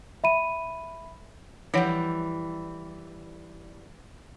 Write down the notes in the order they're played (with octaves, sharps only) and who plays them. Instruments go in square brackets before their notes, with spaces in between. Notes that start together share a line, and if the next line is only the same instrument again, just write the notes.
[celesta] E5 B5 D#7
[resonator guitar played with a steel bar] E3 G3 [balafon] F3 C#5 F#5